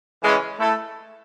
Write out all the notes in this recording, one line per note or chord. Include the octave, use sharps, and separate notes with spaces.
C#3 E3 G#3 C#4
A3 E4 A4